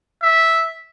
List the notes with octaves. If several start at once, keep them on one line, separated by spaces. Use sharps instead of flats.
E5